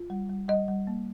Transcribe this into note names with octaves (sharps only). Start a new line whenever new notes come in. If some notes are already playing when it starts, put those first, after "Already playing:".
Already playing: F4
G3
G3
G3 D#5
G3
A#3